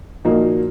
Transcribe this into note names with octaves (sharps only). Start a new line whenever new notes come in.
A#2 F3 A#3 D#4 F#4